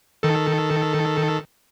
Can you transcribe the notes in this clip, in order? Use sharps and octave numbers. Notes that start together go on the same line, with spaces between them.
D#3 A4